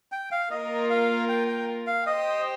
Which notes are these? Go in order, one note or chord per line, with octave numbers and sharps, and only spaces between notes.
G5
F5
A#3 F4 A#4 D#5
F5
G5
G5
F5
G4 C5 D#5 G5